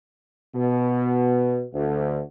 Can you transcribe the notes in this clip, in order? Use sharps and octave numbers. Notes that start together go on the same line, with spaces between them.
B2
D2